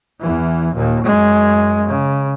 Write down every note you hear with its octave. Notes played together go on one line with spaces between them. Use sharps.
E2 E3
D#2 A#2
F#2 G#3
C#3